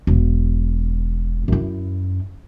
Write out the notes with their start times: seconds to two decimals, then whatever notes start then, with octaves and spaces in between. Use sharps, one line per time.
0.07 E1
1.48 F#2 E4